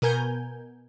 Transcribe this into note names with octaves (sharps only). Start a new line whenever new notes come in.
B2 B3 A#4 G#5 G6